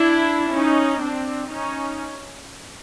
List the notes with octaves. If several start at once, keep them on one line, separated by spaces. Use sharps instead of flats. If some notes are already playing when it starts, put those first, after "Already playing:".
Already playing: D4 E4
C#4 D#4
C4 D4
C#4 D#4